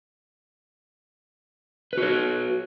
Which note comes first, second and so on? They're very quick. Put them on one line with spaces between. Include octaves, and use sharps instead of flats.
B4 F#4 C#5